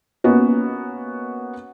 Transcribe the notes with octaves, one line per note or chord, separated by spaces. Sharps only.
A#3 B3 C#4 F#4 D#5